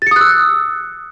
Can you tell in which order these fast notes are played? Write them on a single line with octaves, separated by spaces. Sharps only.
A6 C#7 D#6 F#6 E6